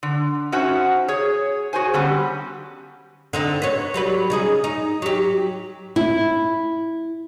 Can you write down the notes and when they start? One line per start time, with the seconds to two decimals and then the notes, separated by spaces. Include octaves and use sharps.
0.03 D3
0.52 C#4 D#4 F#4 C5 E5 F#5
1.08 G#4 C#5
1.73 F#4 G#4 C5 G#5
1.94 D3 F#3 G3 B3 C#4 G4
3.33 D3 C4 D#4
3.62 B4 C#5
3.94 F#3 G3 B4
4.30 C#3 D#4 G#4
4.64 D#4
5.02 F#3 G4
5.96 E4